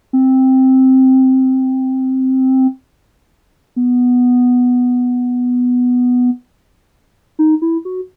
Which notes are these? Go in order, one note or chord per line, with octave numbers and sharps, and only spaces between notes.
C4
B3
D#4
E4
F#4